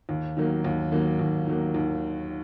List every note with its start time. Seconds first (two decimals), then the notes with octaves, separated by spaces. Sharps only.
0.09 D#2
0.37 D#3 F#3 A#3
0.64 D#2
0.92 D#3 F#3 A#3
1.19 D#2
1.47 D#3 F#3 A#3
1.74 D#2